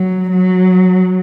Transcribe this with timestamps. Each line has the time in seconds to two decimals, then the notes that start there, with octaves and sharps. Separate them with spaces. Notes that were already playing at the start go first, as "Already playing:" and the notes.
Already playing: F#3
0.31 F#3